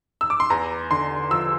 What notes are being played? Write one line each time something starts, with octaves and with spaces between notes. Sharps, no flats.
E6
D6
C6
E2 A#5
D3 C6
F3 E6